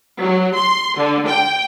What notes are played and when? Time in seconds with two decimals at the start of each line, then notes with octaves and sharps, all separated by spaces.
0.20 F#3
0.55 C6
0.97 D3
1.28 G5